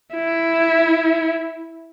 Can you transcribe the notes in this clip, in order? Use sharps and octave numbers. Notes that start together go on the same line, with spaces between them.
E4